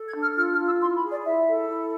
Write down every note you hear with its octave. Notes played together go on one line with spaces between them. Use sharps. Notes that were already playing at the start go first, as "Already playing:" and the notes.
Already playing: A4
G#6
D4
F6
F4 F6
F6
F4
E6
E4 C6
B5
G#4
D5
E4 E5
A4
E4